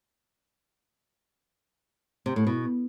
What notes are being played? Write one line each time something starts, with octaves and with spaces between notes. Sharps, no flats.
C3
A2
B2